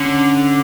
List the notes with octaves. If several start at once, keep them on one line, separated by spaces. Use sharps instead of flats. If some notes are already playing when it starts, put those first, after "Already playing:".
Already playing: D3 C#4